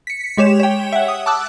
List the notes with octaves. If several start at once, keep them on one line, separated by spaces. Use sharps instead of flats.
B6 C#7
G#3 G4 C#5 E7
C#5 G5
E5 F#5
D#6
A5 D6 E6 F#6